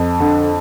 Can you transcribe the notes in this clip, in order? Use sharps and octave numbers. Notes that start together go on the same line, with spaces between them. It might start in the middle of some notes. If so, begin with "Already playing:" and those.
Already playing: F2
D3